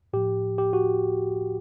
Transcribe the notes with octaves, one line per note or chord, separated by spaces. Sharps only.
A2 F3 G4
G4
F#4